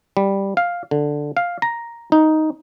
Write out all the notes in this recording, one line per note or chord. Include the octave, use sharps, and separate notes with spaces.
G3
F5
D3
F5
A#5
D#4